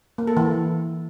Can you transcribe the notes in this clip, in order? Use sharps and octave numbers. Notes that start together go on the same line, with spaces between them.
A#3
A4
E3